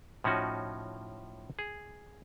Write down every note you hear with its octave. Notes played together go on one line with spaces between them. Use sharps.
A2 F3 C#4 D#4 F#4
G#4